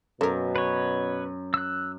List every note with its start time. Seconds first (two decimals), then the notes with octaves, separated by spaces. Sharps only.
0.21 F#2 B2 A4 A#4
0.56 B4 C#5
1.54 E6 F#6